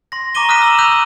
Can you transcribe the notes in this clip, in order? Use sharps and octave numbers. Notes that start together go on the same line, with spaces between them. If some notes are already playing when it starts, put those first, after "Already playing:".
C6 A#6
A#5 C#6 D6 A#6 D#7 G7
D#6 F6 F#6 B6 D#7 E7
E6 E7 F#7
E6 F#6 G6 D#7 F7